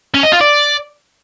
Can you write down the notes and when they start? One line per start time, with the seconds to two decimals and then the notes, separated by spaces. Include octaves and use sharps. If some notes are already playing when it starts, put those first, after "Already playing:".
0.15 C#4
0.23 D#5
0.32 F4
0.41 D5